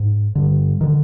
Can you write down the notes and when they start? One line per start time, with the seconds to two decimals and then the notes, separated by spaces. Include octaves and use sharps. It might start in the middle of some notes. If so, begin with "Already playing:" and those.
Already playing: G#2
0.35 G2 D3
0.81 D3 D#3